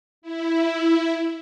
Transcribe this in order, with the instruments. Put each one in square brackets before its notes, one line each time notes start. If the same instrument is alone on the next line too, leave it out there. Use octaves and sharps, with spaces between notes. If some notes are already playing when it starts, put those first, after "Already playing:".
[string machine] E4